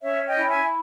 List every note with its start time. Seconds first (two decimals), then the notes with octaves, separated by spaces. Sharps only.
0.02 C#4 C#5 E5
0.25 D#5 G5
0.36 E4
0.48 E5 G#5